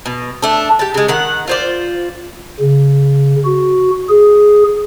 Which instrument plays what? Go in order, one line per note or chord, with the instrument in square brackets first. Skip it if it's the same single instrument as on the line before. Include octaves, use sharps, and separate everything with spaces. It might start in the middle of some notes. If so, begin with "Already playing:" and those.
[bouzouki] B2
A3 D4
G4 A5
C#3 G#3
D#3 F#5
F4 C5 D5
[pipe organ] C#3
F#4
G#4